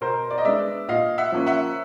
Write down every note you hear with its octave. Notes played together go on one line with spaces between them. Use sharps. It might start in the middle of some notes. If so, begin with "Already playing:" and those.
B2 A#4 C5
D5
D#5
G#3 B3 D4 D5 E5
A#2 D#5 F5
E5 F#5
F3 A#3 C#4
E5 F#5